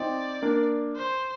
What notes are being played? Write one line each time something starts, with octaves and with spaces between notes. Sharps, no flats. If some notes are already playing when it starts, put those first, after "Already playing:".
Already playing: C4 D#4 D5
A#3 D4
C5